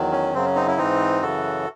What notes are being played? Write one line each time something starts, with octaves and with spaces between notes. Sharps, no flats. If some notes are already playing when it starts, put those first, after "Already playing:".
Already playing: E2 D#3 F#3
C#4
F#2 C#3 F#3 C4
C#4
C4 D#4
C#4 E4
G#2 E3 C4 D#4
F#2 C#3 E3 F#4 A4